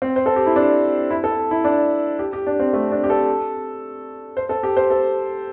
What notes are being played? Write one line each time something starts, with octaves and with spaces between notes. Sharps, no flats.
C4
C5
A4
G4
E4
D4
E4
A4
E4
D4
G4
G4
D4
C4
A3
D4
G4
A4
C5
A4
G4
C5
A4